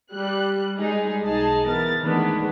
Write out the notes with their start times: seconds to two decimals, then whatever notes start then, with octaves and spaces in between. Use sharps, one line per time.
0.12 G3 F#6
0.76 G3 G#3 D#4 G#4
1.22 B1 D#4 G#4 D#5 A5 C7
1.66 E3 B3 A#4 A6
2.01 D#3 E3 G#3 A3 B3 D4